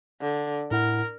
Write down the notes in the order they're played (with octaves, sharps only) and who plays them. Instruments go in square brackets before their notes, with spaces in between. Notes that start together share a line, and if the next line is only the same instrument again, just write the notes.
[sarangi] D3
[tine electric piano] A2 E4 F#5 [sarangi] A#4